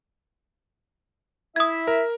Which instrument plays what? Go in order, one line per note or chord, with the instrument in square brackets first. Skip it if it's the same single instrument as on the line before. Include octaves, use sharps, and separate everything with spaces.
[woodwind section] E4 E5 [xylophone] D#6 G#6
[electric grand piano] A#4